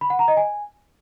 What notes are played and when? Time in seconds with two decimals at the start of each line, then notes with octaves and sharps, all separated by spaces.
0.01 B5
0.10 F#5
0.19 A#5
0.28 D#5
0.37 G#5